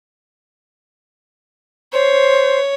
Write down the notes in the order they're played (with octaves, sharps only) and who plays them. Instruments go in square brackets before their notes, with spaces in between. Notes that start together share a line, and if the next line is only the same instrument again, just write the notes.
[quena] C5 [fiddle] C#5